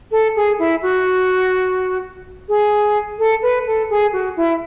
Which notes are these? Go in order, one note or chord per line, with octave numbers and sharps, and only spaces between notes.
A4
G#4
E4
F#4
G#4
A4
B4
A4
G#4
F#4
E4